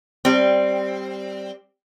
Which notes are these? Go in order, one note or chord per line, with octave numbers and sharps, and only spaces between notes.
G3 C4